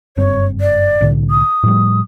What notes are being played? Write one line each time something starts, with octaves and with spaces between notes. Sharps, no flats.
F#1 G2 C4 C#5
D5
C2 A2 D3
D#6
A2 F3 G3